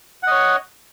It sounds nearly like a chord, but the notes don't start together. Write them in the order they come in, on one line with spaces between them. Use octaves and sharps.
F#5 D#5 C#5